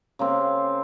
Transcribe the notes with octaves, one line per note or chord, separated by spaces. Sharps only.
C#3 A#3 C4